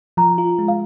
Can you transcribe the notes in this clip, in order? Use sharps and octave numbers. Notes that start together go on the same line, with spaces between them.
F3 A#5
F4
G#3
F5